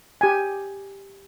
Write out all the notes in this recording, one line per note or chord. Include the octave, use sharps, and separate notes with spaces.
G4 G#5